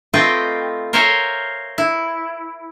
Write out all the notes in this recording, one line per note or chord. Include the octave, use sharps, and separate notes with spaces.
A3 C4 F4 B4 D#5 G5
A#4 C5 C#5 E5 F5 G#5
E4